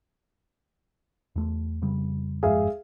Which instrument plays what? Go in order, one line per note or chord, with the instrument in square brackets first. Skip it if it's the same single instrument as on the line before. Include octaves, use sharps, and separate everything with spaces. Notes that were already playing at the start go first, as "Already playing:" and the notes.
[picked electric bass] E2 A3
F2 C#3 G3
[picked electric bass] G1 F2 G#2 [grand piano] G#4 E5 F5